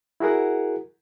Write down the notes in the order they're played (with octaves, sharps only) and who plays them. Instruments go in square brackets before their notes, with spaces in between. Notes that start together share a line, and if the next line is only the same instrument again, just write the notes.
[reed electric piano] E4 F#4 G#4 A#4 F#5